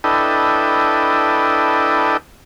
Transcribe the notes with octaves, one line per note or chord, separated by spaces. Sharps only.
D4 E4 A4 B4 D#5 G5